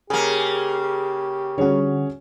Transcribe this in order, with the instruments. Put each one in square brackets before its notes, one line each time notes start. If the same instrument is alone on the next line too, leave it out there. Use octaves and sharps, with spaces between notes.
[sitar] C#3 A#3 [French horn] G4 [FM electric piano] G#4
[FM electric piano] D3 G3 F#4 [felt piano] C#4 G#4 C#5